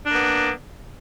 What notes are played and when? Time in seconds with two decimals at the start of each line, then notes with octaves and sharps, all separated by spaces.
0.06 D4
0.11 A#3
0.15 B3